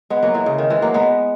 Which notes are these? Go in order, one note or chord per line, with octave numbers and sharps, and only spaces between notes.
G#3 B3
F#3 A#3
E3 G#3
C#3
D#3
E3 G#3
F#3 A#3
G#3 B3